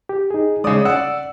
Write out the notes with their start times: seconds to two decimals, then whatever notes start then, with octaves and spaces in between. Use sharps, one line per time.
0.09 G4
0.31 D#4 G#4
0.64 C#3 G#3 D5 D#6
0.85 D5 F#5 E6